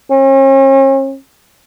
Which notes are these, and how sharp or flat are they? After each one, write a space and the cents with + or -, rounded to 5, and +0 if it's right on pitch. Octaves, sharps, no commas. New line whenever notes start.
C#4 -45